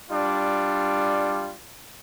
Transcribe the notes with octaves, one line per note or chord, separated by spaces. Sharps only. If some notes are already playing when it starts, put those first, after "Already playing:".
G3 D4 F4